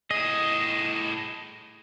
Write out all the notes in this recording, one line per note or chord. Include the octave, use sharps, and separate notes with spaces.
A2 G#4 D#5